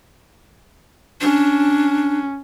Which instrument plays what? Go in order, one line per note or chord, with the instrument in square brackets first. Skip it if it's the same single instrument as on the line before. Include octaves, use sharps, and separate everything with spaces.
[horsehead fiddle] C#4 [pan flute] D4